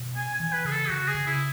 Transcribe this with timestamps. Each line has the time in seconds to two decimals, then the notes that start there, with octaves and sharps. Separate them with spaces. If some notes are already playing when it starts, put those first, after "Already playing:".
Already playing: B2
0.16 B3 G#5
0.34 G#5
0.40 E3
0.53 B4
0.65 C#3 G#4
0.71 A4
0.89 C#3 F#4
1.08 G#4
1.14 C#3
1.27 E4